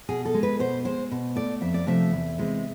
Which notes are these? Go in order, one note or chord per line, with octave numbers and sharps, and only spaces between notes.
B2 G#4
A4
G#3
B4
B2 C5
G#3 C5
B2
A3 D5
F2 E5
D5
C3 F3 A3 E5
E2
C3 E3 G#3